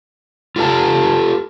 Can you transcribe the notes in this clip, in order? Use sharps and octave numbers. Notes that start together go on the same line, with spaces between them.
F4 G4 A4 E5 A5